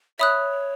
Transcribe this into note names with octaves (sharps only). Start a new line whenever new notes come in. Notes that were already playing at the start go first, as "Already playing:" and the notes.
C#5 E5 B5 D#6 F#6